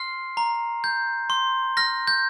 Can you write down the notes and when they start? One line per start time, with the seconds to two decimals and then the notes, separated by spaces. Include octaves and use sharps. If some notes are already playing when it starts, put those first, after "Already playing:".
Already playing: C6 F6 C7
0.37 A#5
0.84 G6
1.30 C6
1.77 F6 A#6
2.08 G6